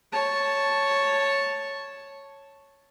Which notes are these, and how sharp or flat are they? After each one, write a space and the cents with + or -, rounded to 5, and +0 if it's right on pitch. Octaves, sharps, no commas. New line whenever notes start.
C#5 +0 A5 +0